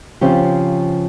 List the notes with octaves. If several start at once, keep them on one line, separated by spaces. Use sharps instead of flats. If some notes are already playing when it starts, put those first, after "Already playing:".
C#3 F3 C4 G4